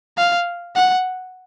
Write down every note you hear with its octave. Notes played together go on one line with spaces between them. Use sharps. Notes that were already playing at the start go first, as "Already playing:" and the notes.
F5
F#5